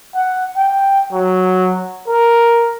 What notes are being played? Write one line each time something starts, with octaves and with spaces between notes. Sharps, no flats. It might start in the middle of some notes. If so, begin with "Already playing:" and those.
F#5
G5
F#3
A#4